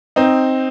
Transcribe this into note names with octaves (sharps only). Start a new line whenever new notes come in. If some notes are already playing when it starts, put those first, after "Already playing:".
C4 D#4